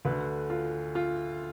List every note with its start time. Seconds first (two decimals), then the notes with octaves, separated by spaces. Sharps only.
0.05 D2 D3 B4
0.50 F4
0.95 F4